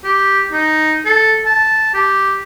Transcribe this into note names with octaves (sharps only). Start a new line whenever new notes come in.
G4
D#4
A4
A5
G4